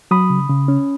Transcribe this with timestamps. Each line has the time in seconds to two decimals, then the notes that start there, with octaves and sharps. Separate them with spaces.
0.11 F#3 B5 D#6
0.30 C#3
0.49 C#3
0.68 C#4